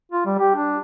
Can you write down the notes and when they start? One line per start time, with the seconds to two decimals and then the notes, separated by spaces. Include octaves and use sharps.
0.12 F4
0.26 G3
0.39 G4
0.56 D4